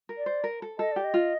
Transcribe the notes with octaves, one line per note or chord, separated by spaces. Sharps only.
A#4
D5
C5
A#4
A4
A4 D#5
G4 D5
D#5
F4